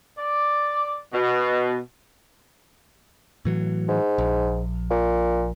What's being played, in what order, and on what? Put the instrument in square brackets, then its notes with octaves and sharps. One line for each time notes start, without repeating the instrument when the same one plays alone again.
[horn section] D5
B2
[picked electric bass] A2 E3 F#3
[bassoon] G#2
[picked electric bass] A#1
[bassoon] A#2